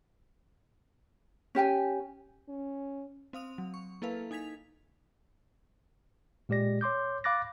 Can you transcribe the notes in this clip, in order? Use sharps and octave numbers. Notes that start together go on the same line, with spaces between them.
C#4 G4 G5 G#5
C#4
C4 F5 D#6 F7
F#3
C#6
A#3 E4 A4 B4 F5
D#4 G#5 G#6 B6 F7
A#2 G#3 G4 D5 A#6
C#5 C6 D6 G6
F5 B5 D6 F#6 A6 A#6